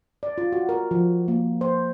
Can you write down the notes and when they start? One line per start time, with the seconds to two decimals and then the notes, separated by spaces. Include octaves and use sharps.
0.23 D5
0.38 F4
0.52 F#4
0.69 A#4
0.91 F3
1.28 A#3
1.61 C5